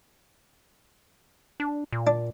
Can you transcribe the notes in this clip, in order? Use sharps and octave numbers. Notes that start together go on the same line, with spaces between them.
D4
A#2
D4